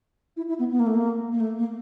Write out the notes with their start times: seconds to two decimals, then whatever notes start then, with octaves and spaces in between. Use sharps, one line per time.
0.37 E4
0.48 E4
0.59 B3
0.71 B3
0.79 A#3
0.86 A3
0.94 A#3
1.32 A#3
1.40 A3
1.58 A#3